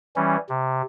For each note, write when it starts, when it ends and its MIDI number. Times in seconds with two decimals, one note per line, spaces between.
0.16 0.37 52
0.16 0.37 55
0.16 0.37 61
0.49 0.82 48